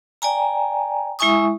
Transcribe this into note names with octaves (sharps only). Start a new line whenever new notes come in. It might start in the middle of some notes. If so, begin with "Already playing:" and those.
D5 G5 G#5 A#5
G#3 E4 E5 G#5 C#6 D#6